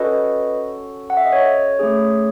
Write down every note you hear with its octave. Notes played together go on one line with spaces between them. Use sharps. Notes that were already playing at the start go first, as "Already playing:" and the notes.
Already playing: C#4 F#4 A4 B4 D#5
F#5
E5
D#5
C#5
A3 C#4 G#4